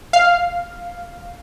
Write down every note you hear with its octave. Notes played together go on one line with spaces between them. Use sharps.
F5